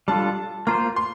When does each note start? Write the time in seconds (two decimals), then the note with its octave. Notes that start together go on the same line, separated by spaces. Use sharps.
0.08 G3 D4 F4 A4 A5
0.67 A#3 F4 C5 A#5
0.96 C6